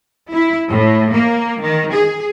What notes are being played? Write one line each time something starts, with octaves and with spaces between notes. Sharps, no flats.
E4
A2
A#3
D#3
G#4